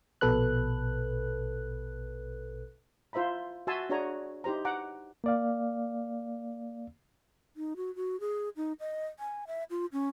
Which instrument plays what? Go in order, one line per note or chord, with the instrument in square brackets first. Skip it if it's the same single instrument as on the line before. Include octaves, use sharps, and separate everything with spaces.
[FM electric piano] A#1 B2 A4 B4 F#6
[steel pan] E4 F4 C5 E5 A#5 B5
F#4 E5 G#5 A5 C6 E6
D4 F#4 G#4 C#5 G#5 A#5
D#4 E4 G4 C5 A#5
F#5 A#5 D6
[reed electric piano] A#3 D5 F5
[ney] D#4
F#4
F#4
G#4
D#4
D#5
G#5
E5
F4
C#4